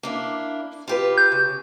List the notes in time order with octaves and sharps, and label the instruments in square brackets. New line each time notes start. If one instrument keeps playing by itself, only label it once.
[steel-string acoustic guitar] A#3 D4 E4
F4 G4 B4
[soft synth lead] G6
[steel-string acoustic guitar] C#3